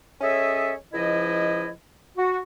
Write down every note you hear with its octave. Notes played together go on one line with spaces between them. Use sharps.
C#4 G#4 A4 C#5 D#5 E5
C#2 F3 E4 D#5
F#4